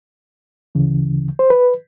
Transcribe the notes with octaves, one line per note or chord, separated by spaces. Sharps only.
D2 C#3 E3
C5
B4